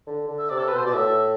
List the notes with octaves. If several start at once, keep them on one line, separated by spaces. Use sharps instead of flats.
D3
D3
E5
C3 D5
A4
B4
B2 C5
B2 D5
A2 E5